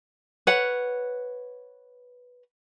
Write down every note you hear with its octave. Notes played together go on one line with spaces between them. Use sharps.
B4 C#5 F#5